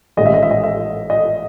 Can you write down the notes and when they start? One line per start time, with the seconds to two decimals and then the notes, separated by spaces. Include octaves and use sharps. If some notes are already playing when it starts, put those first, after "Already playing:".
0.17 A1 G#2 D#3 D#5
0.26 E5
0.34 D#5
0.43 E5
0.51 D#5
0.64 E5
1.10 D#5